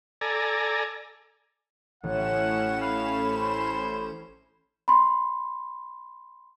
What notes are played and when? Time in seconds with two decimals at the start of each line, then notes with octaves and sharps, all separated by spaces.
0.21 A4 D5 G#5 A#5
2.04 A1 A2 C#4 F#5 E7
2.81 F5 B5
3.33 C5
4.88 B5 C6